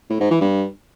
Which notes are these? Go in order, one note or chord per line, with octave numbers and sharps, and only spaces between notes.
A2
G#2
E3
G2